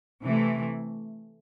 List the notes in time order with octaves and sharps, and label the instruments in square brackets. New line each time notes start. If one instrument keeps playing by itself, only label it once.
[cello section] C3 E3 A3